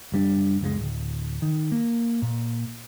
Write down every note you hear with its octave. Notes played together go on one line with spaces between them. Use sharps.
F#1 G3 D4
F#1 C#2 D#3 G#3
D1
D#3
A#3
A#2